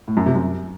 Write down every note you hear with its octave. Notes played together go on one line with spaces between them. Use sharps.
A2
F#2
C3
F#2